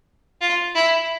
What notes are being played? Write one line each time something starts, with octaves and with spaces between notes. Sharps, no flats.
F4
E4